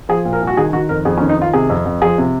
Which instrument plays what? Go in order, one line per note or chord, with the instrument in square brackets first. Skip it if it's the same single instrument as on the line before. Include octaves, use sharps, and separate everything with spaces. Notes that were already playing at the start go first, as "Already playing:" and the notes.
[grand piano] F3 G#4
A#2
A#4
C2
F#4
D#3 G#4
D#3 F#4
F2 A#4
F2 G#4
C#4
D#3
D#4
D#3 F4
C3 G#4
F2
F2
F3 G#4
C3